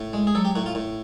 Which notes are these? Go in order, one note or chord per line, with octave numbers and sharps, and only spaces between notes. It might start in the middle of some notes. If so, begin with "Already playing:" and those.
Already playing: A2
G#3
G#4
F#3 A4
G4
A2 F#4
F4
A2